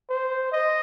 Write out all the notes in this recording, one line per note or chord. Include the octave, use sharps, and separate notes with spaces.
C5
D#5